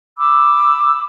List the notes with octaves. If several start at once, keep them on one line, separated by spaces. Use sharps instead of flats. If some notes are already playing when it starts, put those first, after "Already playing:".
B5 D6 E6